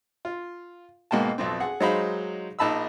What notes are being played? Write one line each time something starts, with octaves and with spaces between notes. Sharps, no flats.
F4
G#2 B2 A#3 G5 A5
B1 F2 C4
G#4 F#5
F#3 G#3 D#4 C5 F5 B5
A#1 D#4 A5 B5 E6